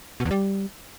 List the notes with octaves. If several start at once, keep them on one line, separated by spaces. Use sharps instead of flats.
B2
E2
G3